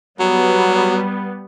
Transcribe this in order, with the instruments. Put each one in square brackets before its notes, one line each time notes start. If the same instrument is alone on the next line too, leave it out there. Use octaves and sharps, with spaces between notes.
[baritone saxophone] F#3 [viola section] G3 B3